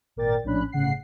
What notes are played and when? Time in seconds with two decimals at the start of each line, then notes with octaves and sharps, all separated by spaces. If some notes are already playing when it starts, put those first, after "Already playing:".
0.16 G#1 A#2 A#4 D5 G5 A6
0.44 A#1 A2 C#4 D4 B5 F#6
0.72 G1 A2 C#3 F#5 C7